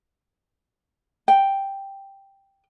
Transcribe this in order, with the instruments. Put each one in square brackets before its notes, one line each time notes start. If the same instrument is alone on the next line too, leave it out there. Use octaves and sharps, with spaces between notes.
[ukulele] G5